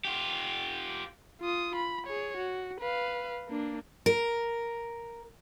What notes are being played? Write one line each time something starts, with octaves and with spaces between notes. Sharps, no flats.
F4 G4
F4 D#6
B5
G#4 C#5
F#4
B4 F5
A#3 D4
A#4